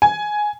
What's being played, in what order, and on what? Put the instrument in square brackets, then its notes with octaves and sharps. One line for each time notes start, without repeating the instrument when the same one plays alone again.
[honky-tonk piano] G#5